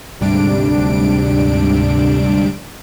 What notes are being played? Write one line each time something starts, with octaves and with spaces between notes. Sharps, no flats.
D2 G#2 C3 G3 D4 D7